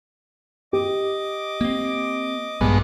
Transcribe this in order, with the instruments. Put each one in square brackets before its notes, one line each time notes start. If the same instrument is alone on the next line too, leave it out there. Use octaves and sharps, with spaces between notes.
[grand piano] G4 [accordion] D#5 D6
[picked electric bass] A#3 C4
[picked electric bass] A#1 [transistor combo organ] G2 G#3 B3